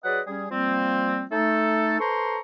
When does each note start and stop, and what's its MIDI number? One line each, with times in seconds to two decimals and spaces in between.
0.05 0.21 54
0.05 0.21 68
0.05 0.21 71
0.05 0.21 74
0.05 0.21 75
0.05 0.21 78
0.27 0.46 55
0.27 0.46 61
0.27 0.46 68
0.51 1.23 53
0.51 1.23 55
0.51 1.23 58
0.51 1.23 60
1.31 1.96 57
1.31 1.96 63
1.31 1.96 69
2.00 2.39 69
2.00 2.39 71
2.00 2.39 72
2.00 2.39 82
2.00 2.39 84
2.00 2.39 85